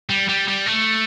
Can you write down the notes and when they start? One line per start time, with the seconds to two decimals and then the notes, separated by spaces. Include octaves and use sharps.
0.10 G3
0.29 G3
0.48 G3
0.66 A3